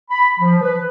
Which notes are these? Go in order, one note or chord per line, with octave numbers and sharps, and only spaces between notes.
B5
F3
B4